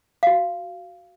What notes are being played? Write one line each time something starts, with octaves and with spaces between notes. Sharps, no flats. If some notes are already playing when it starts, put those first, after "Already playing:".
F#4 F5